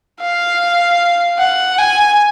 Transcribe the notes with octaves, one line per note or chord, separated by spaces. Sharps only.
F5
F#5
G#5